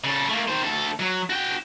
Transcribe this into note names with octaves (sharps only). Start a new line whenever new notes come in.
C#3 A4
A3 A#3
D#3 C5
D2 A4
F#3
F#4 G5